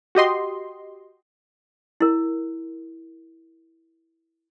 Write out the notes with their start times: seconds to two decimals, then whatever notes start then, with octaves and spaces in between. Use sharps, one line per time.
0.15 F#4 G4 D#5 C6
2.01 E4 A#4